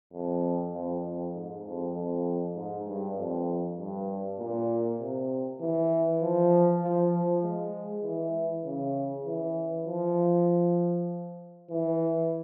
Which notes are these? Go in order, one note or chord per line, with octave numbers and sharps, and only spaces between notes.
F2
F2
F2
G#2
F2
F2
G#2
G2
F2
G2
A#2
C3
E3
F3
F3
F3
G#3
E3
C#3
E3
F3
E3